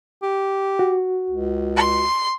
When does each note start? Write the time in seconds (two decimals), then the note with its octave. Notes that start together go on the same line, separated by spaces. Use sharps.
0.22 G4
0.79 F#4
1.30 C#2
1.77 C6